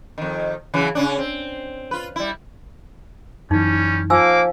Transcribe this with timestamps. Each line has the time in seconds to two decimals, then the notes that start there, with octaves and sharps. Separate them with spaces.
0.18 F2 D#3
0.74 C#3 E3 F#3
0.95 C#3 C#4 D4
1.19 C4
1.91 F4 B4
2.16 G3 E4
3.51 F#2 E3 G3 C#4 D#4
4.10 F3 A#3 G#5 D6 E6